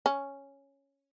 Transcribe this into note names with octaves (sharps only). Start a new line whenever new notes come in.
C#4